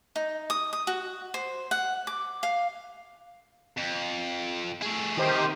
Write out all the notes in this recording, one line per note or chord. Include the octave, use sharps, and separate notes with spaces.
D#4
D#6
D#6
F#4
C5
F#5
D6
F5
F2
A3 G#4
C3 D#3 G4 C5 D#5